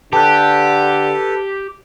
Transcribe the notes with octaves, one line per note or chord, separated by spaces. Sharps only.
D3 G4 A4 B4 A5 F#6